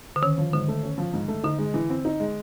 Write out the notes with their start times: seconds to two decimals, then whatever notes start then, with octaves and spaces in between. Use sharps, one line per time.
0.16 D3
0.22 D#3 C#4
0.38 F3
0.53 G#2 D3
0.68 A3
0.83 C#4
0.98 F3
1.13 G#2
1.28 A3
1.43 D3 D#4
1.59 G#3
1.74 E3
1.90 C4
2.05 D#4
2.20 G#3